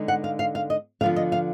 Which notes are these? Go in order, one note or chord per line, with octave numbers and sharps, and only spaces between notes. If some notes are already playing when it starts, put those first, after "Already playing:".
Already playing: D3 G#3 B3 D#4
F#5
F5
F5
F5
D#5
D3 F3 B3 F5
D#5
F5